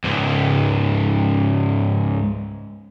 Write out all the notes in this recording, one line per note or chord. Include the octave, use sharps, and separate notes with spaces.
C#2 G#2